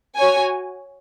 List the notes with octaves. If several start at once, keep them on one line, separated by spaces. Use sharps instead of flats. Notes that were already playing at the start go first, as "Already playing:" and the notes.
F#4 C#5 G#5